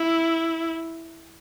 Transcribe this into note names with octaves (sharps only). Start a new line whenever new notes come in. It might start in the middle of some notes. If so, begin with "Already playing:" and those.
Already playing: E4